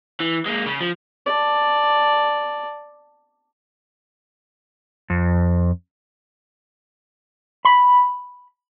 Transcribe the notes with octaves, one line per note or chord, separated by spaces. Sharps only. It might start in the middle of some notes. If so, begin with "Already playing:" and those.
E3
G#3 A#3
C#3
F3
D5 A5
F2
B5